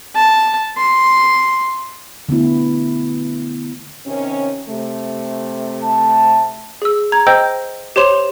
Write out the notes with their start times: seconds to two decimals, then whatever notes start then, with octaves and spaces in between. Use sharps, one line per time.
0.16 A5
0.77 C6
2.29 D3 A3 B3 E4
4.06 C3 D#3 C#4
4.68 C3 A3
5.84 A5
6.82 G#4 E6
7.12 A#5 G#6
7.27 C5 D#5 G5 E6 G6
7.96 G4 C5 C#5 C6 E7 F7